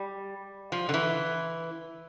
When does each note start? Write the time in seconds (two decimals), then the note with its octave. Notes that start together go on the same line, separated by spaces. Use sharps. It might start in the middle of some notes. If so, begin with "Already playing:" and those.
Already playing: G3
0.72 F3
0.89 D3
0.94 E3